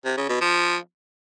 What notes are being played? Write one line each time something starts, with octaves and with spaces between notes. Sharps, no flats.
C3
C#3
B2
F3